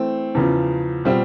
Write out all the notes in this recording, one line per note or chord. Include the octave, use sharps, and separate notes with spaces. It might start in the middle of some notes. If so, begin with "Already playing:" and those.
Already playing: E3 A3 C4
E2 C#3 F3
B2 G3 C4 F4